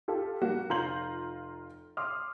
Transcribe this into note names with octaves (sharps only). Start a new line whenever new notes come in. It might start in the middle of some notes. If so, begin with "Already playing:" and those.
F4 G4 A4
G3 A#3 F#4
F1 F4 A#5 C6 G6 F#7
C6 D6 D#6 F6